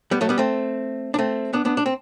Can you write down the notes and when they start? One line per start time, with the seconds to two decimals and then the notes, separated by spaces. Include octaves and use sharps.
0.11 G3 B3
0.21 F#3 A3
0.29 G3 B3
0.38 A3 C4
1.14 D4
1.18 A3 C4
1.53 B3 D4
1.65 B3 D4
1.77 D4
1.86 C4